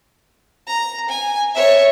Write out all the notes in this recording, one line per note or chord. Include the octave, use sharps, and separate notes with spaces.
A#5
G#5
C#5 E5